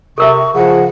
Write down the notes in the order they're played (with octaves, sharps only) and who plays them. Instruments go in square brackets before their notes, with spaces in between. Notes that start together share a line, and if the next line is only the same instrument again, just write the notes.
[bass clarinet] C3 [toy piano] A4 A#4 E5 [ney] C#6
[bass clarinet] C#3 [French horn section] F3 [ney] F#5